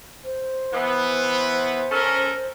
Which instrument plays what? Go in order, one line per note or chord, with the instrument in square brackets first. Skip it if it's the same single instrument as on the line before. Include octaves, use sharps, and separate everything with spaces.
[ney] C5
[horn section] E3 B3
C#4 A4 A#4